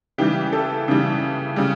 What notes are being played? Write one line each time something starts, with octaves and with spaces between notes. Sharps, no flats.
C#3 E3 G3 G4
A4
C#3 E3 G3
C#3 G3